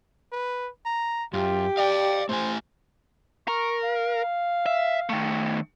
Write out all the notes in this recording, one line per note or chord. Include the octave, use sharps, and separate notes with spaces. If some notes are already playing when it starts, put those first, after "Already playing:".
B4
A#5
F#2 F4 G4
D5 F5 G5
A3 E4 C5 G#5
A#4 C#6
F5
E5
D#3 A3